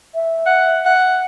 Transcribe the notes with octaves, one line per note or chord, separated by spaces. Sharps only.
E5
F#5
F#5